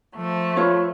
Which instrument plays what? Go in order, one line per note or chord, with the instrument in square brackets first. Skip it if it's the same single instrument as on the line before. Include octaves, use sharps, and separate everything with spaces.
[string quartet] F3 A3
[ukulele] F4 B4 C#5